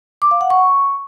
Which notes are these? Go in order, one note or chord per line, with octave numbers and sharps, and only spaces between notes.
D6
F5
F#5
C#6